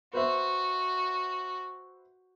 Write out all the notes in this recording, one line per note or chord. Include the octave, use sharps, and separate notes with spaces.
F#4 B4 C5 E5